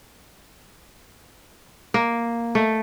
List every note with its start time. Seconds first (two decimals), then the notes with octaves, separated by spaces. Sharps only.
1.94 A#3
2.55 A3